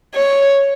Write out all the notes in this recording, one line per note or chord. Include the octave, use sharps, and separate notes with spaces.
C#5